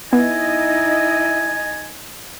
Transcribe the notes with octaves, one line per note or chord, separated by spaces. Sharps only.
B3 D#4 E4 D#5 G#5